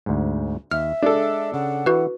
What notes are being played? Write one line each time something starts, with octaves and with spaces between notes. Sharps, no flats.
D2 G#2
D#2 E5 F6
G#3 D4 A4
C#3 F#5
E3 F#4 B4